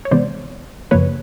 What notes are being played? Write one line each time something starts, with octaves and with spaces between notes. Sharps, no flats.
C#5
C3 E3 G#3 B3 C5 D5
F#2 C#3 F3 A#3 B4 C#5